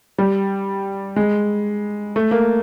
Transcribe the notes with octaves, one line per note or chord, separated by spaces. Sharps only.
G3
G#3
A3
A#3